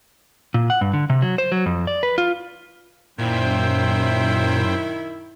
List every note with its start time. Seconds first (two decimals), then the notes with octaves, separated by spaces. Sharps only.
0.54 A#2
0.70 F#5
0.81 G2
0.93 D3
1.10 C3
1.22 F#3
1.38 C5
1.52 F#3
1.66 F2
1.87 D5
2.03 B4
2.18 F4
3.19 F#2 A#2 D#3 E4 C5 G5